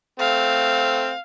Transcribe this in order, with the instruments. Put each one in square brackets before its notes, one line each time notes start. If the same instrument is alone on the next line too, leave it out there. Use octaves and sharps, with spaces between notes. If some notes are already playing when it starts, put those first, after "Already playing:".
[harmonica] A3 C4 [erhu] F5